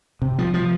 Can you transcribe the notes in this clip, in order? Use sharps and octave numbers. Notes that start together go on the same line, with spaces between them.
C3
F3
F3